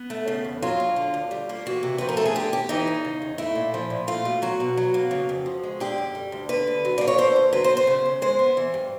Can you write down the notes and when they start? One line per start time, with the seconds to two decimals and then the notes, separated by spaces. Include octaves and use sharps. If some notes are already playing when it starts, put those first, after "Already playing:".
Already playing: B3
0.10 A3
0.28 C#3
0.45 E2
0.62 F#3 F4
0.80 D2
0.96 D3
1.14 D2
1.31 G3
1.49 A#3
1.66 E3 F#4
1.83 C3
1.98 F3 B4
2.09 A#4
2.17 A3 A4
2.25 G#4
2.35 D3 G4
2.52 D#2 G4
2.69 E3 D#4
2.87 E2
3.05 C#3
3.22 E2
3.38 A3 E4
3.55 A#2
3.74 F3
3.90 A#2
4.07 A3 F4
4.25 B2
4.42 F#3 F#4
4.60 B2
4.77 F#3
4.94 A#3
5.11 C#3
5.29 F2
5.46 F3
5.63 G#3
5.80 D3 G4
5.98 F#2
6.15 G3
6.32 D2
6.49 D3 B4
6.67 D2
6.85 F#3
6.98 A#3 D5
7.08 C#5
7.18 D3 C5
7.36 D2
7.53 F#3 B4
7.64 C5
7.71 B3
7.77 C5
7.87 C#3
8.06 D#2
8.22 G#3 C5
8.39 B3
8.57 E3
8.74 G2